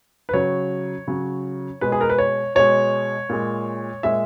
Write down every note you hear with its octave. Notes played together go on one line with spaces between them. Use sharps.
B4
C#3 F#3 C#5
C#3 F#3
B2 G#3 B4
G#4
A#4
B4
C#5
B2 G#3 C#5
A#2 G#3
A#2 G#3 E5